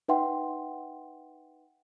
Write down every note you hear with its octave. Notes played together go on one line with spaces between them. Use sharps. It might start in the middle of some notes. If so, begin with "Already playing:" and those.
D#4 B4 E5 F#5 G5 C6